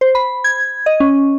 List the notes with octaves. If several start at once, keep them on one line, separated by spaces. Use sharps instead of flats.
C5
B5
G#6
D#5
C#4